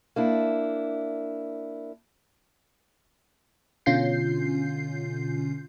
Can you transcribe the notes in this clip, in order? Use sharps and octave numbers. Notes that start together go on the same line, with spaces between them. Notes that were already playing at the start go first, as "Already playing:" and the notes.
A#3 D4 E4
B2 D3 C#4 F4 G6 C7